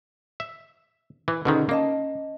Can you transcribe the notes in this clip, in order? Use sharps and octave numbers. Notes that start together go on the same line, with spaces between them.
E5
E3
B2 D3 D#3 C#4 D#4 G#4
A#3 C#4 D#5 A5